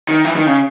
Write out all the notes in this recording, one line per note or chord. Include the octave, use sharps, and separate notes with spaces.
D#3
E3
D#3
C#3